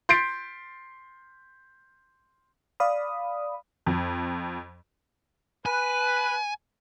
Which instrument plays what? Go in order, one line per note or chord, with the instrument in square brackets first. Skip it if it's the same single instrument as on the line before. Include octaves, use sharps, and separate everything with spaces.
[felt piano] C6 G6 A6 B6 C7 D7
[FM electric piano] D5 F5 B5 D#6
[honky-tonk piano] F2
[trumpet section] B4 [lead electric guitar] G#5